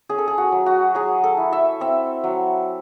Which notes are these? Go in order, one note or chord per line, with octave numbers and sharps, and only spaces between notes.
C#4 G#4
A4
G#4
F#4
F#3
F#4
F#3 G#4
A4
E4
E5
C4 E5
F#3